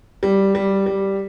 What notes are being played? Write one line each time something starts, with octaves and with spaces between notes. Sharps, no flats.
G3
G3
G3